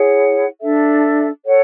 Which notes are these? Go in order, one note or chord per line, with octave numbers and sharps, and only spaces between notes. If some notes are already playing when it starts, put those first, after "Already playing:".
Already playing: E4 G#4 C#5 F#5
D4 A4 E5
A4 C#5 F#5